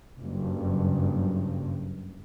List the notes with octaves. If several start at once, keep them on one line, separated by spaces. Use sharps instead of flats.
F#1 G2